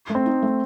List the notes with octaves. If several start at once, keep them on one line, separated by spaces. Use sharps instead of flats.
A3
C4
D#4
A3